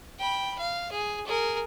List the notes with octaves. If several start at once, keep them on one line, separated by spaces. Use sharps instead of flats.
G5 B5
F5
G#4
G#4 A#4